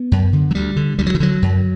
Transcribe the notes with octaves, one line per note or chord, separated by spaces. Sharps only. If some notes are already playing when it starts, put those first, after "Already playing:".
Already playing: B3
F#2
D3
F#3
D2 G3
D3
D2 G3
F#3
E3
D3 F#3
F#2